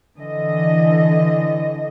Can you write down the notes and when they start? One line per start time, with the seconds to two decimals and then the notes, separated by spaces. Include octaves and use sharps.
0.17 D3 E3 D#5